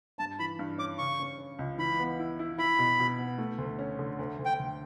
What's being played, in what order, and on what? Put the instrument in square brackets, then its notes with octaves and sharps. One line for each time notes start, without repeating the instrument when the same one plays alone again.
[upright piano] G2 [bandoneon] A5
[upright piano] E3 [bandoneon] B5
[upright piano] G2
[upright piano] C#4 [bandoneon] D6
[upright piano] C#3 [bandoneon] C#6
[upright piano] C#4
C#4
C#2
[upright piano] E3 [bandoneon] B5
[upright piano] B3
E4
E4
[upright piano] E4 [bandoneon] B5
[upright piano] B2
B2
B3
A3
D2
C#4
D3
D2
D2
[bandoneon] G5
[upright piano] D2